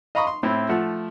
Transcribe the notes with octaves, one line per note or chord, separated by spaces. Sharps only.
D#5 F5 A#5 B5 C#6 D#6
C6
A2 C4 E4
F3 A3 F#5